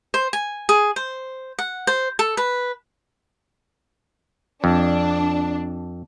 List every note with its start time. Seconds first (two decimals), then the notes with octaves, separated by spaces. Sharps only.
0.14 C5
0.33 G#5
0.69 G#4
0.96 C5
1.59 F#5
1.87 C5
2.19 A4
2.37 B4
4.64 F2 D4